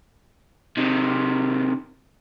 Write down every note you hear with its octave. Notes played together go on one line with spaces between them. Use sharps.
C3 D#3